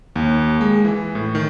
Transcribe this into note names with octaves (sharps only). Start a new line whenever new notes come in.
D#2
G#3
E3
A2
D#3